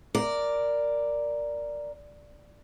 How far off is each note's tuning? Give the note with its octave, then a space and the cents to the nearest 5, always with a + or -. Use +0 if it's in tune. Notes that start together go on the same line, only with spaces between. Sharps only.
A#4 +0 D5 +0